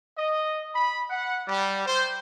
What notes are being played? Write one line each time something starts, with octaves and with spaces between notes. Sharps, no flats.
D#5
B5
F#5
G3
C5